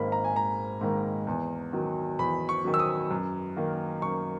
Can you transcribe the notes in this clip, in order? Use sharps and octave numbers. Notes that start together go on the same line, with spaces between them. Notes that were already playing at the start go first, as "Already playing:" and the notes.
Already playing: G#1 G#2 D#3 A#3 B5
A#5
G#5
G#1 A#5
G#2 D#3 A#3
E2
D#3 F#3
E2 B5
C#6
D#3 F#3
E6
D#6
F#2
D#3 A#3
F#2 C#6